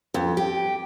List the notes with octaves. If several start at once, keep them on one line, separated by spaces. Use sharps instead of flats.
F2
G4